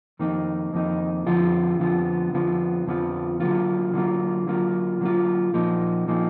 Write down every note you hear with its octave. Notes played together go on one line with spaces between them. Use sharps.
F2 D#3 A#3 D#4
F2 D#3 A#3 D#4
F2 D3 F3 B3 F4
F2 D3 F3 B3 F4
F2 D3 F3 B3 F4
F2 D3 F3 B3 F4
D3 F#3 A#3 F4
D3 F#3 A#3 F4
D3 F#3 A#3 F4
D3 F#3 A#3 F4
A#2 F3 A#3 D#4
A#2 F3 A#3 D#4